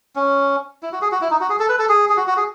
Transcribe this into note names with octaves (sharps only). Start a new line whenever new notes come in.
C#4
E4
F#4
G#4
F#4
E4
D#4
F#4
G#4
A4
B4
A4
G#4
G#4
F#4
F#4
G#4